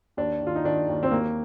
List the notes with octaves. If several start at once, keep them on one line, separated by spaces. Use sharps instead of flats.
D#2 D4
D#3
F4
D#4
D#3 D4
D#2
C4
D#2 A#3